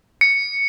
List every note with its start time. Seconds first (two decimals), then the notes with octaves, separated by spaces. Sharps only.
0.21 C#7